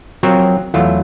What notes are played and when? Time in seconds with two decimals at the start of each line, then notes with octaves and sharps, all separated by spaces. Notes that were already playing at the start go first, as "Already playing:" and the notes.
0.23 F3 F#3 C4 F#4 A#4 C#5
0.74 E2 F#3 A3 E4 F4